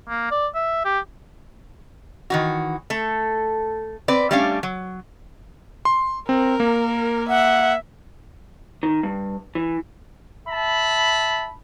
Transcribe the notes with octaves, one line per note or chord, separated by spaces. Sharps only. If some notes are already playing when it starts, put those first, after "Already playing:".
A#3
D5
E5
G4
D#3 E3 F#4
A3 A4
C4 B4 D5
G3 A3 C#4 D4 F5
F#3
C6
C4 A#4
A#3
E5 F#5
D#3
G2
E3
E5 A5 B5